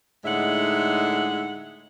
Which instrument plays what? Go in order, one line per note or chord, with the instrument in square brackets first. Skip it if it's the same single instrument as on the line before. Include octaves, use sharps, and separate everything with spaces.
[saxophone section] A2 D3 G#3 D#4 E5 F#5